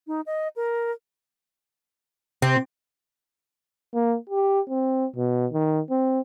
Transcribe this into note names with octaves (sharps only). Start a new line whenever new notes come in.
D#4
D#5
A#4
C3 C4
A#3
G4
C4
B2
D#3
C4